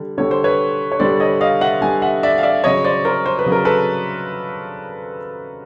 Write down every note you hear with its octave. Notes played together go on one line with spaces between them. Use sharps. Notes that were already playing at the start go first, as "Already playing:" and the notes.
Already playing: D3 G3
D3 G3 C#5
C5
B4 C#5
C#5
D3 G3 C5 D5
C#5 D#5
D#5 F5
E5 F#5
D3 G3 F#5 G#5
E5 F#5
D5 E5
F5
D5 E5
C#3 F#3 C#5 D#5
C5 D5
A#4 C5
C5
B4
C#3 F#3
A#4
A4 B4